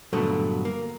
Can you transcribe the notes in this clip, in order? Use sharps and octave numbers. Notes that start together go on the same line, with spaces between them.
G2 A#2 D3 F#3 A3 B3
A#3